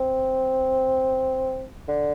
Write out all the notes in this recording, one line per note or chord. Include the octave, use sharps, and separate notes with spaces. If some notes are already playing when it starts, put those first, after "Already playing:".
Already playing: C4
D3